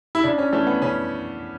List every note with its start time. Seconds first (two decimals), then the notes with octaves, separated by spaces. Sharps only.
0.15 E4
0.24 C#3 D4
0.38 C#4
0.53 E3 A3 C#4
0.67 B3
0.82 C#3 C#4